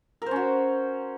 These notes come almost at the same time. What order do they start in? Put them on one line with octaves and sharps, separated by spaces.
A#4 C5 C#4 F#4